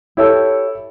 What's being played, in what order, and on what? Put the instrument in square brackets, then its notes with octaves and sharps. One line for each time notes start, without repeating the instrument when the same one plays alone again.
[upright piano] E4 A4 [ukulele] G4 C#5 E5